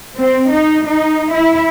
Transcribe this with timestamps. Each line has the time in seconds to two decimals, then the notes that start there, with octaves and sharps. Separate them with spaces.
0.18 C4
0.51 D#4
0.86 D#4
1.31 E4